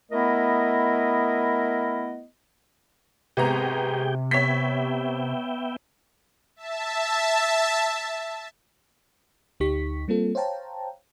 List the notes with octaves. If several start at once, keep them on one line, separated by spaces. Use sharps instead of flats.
A3 B3 E4 A#4 D#5
G#1 C3 B3 G4 G#4 G5 A#5
B3 C#5 E5 G5 B6
E5 A5
D2 D#4 G4 C#6 B6
G3 A#3 C4 F4 A4
C5 C#5 F5 G5 A5 A#5